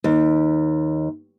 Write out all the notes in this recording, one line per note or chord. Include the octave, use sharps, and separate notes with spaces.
D#2